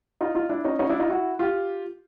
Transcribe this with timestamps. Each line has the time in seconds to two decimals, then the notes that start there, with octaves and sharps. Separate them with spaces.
0.21 D#4 F4
0.35 D#4 F4
0.49 D4 E4
0.65 C#4 D#4
0.79 C#4 D#4
0.89 D4 E4
1.00 D#4 F4
1.09 E4 F#4
1.39 F4 G4